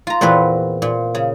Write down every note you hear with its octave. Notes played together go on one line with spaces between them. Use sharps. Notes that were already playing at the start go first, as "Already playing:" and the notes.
F4 A#5
E2 A#2 C4 F#4 B4
A#2
C#3